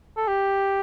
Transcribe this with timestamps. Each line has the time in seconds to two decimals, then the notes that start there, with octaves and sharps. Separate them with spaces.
0.17 A4
0.27 G4